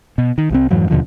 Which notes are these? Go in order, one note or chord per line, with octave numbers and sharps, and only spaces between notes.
B2
D#3
C2 F3 C4
F2 G#2 E3 F#3
D#2 B2 D3 F3